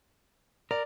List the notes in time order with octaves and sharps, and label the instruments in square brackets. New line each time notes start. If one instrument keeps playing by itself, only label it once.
[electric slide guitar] A#4 [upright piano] D5